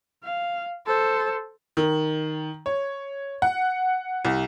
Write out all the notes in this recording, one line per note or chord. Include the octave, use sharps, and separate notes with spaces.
F5
A4 C5
D#3
C#5
F#5
C2